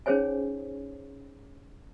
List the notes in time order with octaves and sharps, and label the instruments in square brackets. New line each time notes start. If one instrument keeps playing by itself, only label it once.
[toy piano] C#4 D#4 G#4 C5 C#5 G#5